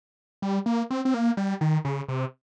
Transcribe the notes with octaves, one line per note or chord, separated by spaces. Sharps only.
G3
A#3
C4
C4
A#3
G3
D#3
C#3
C3